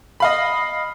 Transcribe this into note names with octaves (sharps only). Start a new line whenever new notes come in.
D#5 F5 B5